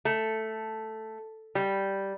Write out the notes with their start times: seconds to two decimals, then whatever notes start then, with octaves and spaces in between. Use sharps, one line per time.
0.05 A3
1.55 G3